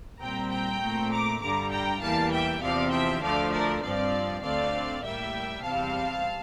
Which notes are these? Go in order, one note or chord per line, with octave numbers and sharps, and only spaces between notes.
A#2 G3 C4 G5 A#5
G5 A#5
A#2 A3 C4
A#5 D6
G2 D3 G3 A#5 D6
G5 A#5
E2 E3 G3 A#3 F5 A5
E5 G5
E2 C3 F3 C4 D5 F5
E5 G5
D2 D3 F3 A3 D5 F5
A#4 D5
G2 F3 C4 D5 F5
D2 D3 A3 C4 D5 F5
A2 G3 A#3 E5 G5
E2 C3 G3 C4 F5 A5